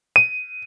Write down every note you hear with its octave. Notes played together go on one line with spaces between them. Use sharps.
D#7